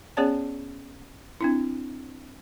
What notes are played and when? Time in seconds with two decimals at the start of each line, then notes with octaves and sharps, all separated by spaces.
0.17 B3 C#4 G#4 C#5 D5 A5
1.41 C4 D4 E4